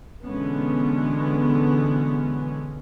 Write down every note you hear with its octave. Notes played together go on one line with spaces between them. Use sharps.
B2 D3 E3 G#3 B3 C#4